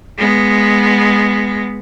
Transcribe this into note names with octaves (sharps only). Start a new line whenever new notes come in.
G#3 B3